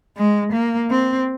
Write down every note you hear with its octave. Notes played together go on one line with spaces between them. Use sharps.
G#3
A#3
C4